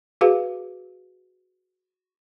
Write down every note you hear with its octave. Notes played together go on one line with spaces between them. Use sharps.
F#4 G#4 B4 F5